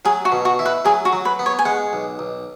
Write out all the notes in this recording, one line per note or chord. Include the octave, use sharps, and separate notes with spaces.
F#3 G#4
F#4
B2
F#4
E4
B4
F#3 G#4
F#4
F#3
B4
B3
C#5
G#5
G#3 F#5
B1
B1